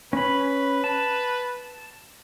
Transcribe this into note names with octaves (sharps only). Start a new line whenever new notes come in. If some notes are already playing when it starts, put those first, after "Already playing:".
C#4 B4 B5
A5